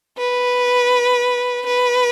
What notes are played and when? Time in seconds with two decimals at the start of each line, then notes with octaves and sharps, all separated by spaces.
0.18 B4
1.66 B4